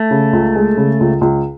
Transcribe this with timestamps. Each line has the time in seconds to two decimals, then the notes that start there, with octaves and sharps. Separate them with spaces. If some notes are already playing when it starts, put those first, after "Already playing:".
Already playing: A3
0.11 C#3
0.33 C#2
0.56 G#3
0.77 C#3
1.00 C#2
1.21 C#2